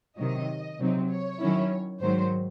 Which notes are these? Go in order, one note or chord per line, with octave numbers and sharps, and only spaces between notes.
C3 D#3 F#3 D#5
C3 F#3 C4 D#4
C#5
D#3 F#3 C#4 E4
G#2 D#3 F#3 C5